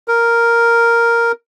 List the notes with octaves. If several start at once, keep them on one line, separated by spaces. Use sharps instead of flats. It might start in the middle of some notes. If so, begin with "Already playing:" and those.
A#4